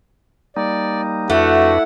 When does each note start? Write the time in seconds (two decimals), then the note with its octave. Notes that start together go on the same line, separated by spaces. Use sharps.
0.56 G3 A#3 D#4 D5
1.30 F2 A3 D4 E4 F#4 B4 F#5